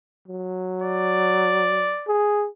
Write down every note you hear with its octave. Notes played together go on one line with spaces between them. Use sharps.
F#3
D5
G#4